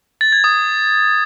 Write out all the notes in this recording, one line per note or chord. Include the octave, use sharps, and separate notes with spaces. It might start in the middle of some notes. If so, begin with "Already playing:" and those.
A6
G#6
D#6